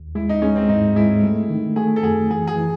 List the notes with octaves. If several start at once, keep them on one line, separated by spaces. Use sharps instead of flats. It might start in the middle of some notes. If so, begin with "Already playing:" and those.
Already playing: D#2
G#3 E4
D#4
G#3 C#4
C4
G#2 D#4
G#3 E4
A3
D#3
A3 G#4
A4
F#2 G#4
E3 G#4
G#4
E3